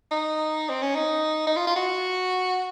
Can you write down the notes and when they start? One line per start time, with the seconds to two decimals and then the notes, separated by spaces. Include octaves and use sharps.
0.11 D#4
0.69 C4
0.82 C#4
0.95 D#4
1.47 D#4
1.56 F4
1.67 F4
1.76 F#4